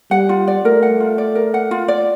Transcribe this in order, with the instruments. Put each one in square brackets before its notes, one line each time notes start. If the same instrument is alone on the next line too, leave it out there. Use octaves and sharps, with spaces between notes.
[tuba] G3 [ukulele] F#5
[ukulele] F4
D5
[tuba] A3 [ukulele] A#4
[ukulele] F#5
F4
D5
A#4
F#5
F4
D5